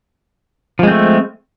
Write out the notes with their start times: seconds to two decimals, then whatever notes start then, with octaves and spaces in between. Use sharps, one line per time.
0.79 F3
0.83 G#3
0.87 C4
0.91 A3